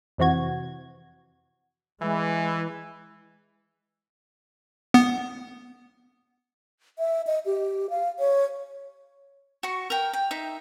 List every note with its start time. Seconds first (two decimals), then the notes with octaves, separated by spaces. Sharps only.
0.18 F2 C3 E3 F#4 G#6
2.02 E3 G#3
4.94 B3
6.99 E5
7.27 D#5
7.46 G4
7.90 F5
8.19 C#5
9.63 F#4 C#6
9.90 A#4 G5
10.13 G5
10.31 D#4 E5